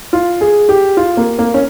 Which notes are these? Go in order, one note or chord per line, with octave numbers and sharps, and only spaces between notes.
F4
G#4
G4
F4
A#3
A#3
C#4